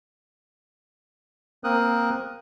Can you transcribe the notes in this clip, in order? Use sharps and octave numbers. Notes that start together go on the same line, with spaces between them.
A#3 C4 A#4 D#6 F#6